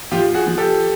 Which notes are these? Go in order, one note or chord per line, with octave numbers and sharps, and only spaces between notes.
F3 F4 G4
F#4 G#4
F3
G4 A4